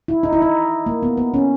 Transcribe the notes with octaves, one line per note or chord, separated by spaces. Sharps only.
E4
D#4
E4
D#4
A#3
B3
B3
C#4